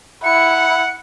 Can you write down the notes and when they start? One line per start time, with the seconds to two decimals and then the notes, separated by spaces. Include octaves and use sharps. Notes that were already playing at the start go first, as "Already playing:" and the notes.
0.24 E4 F#5 C#7